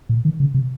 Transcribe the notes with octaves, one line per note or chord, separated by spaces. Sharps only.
A#2
D#3
C#3
C3